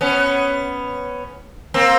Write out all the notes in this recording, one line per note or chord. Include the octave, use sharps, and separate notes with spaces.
B3 C#4
A#3 C4